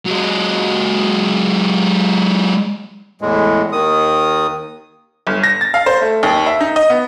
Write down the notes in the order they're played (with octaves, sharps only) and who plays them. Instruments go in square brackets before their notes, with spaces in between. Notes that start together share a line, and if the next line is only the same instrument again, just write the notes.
[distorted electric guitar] F#3 G#3
[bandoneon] E2 A2 G#3
D#2 D#3 D#6
[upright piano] G1
A#6
A6
F5
C5
A3
D#2
E5
D#4
D#5
B3